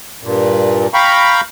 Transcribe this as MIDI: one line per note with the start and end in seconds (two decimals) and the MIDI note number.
0.23 0.87 43
0.23 0.87 46
0.94 1.41 77
0.94 1.41 79
0.94 1.41 82
0.94 1.41 83
0.94 1.41 85